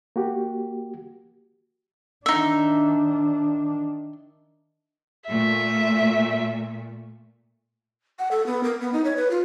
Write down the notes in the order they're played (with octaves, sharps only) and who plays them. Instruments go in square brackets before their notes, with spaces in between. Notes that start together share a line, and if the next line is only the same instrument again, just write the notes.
[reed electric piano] A#3 F#4 G4
[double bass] D#3 D4 [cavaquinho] D#4 E5
[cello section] A#2 A3 [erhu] E5
[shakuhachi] F#5
A4
B3
A#4
B3
D#4
C#5
B4
F4